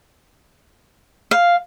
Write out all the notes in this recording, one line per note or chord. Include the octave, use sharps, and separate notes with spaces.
F5